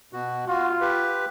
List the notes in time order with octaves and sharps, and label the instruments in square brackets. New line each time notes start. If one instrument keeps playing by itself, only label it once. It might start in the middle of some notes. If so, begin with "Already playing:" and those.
[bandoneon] B2 F#4
[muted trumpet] F4 [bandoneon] F#4
[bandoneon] G4 B4